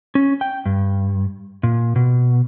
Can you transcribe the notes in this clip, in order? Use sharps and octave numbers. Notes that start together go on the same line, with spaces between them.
C#4
G5
G2
A#2
B2